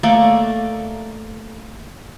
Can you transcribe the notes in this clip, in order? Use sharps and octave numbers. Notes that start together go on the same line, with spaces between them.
A3 A#3 D5